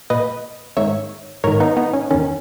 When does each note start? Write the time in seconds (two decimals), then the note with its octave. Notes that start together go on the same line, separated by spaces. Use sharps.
0.10 A#2 B4 D#5
0.77 G#2 D#3 C#5 E5
1.44 G#2 D#3 A#4 C#5
1.60 B3 D#4
1.77 B3 D#4
1.93 C#4
2.11 E2 D#3 C#4